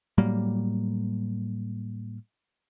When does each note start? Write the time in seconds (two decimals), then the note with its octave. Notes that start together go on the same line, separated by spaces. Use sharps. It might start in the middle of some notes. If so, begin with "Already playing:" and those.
0.18 A2 F#3 G3 A#3